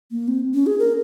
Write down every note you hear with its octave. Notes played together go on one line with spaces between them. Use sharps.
A#3
C4
C#4
G#4
A#4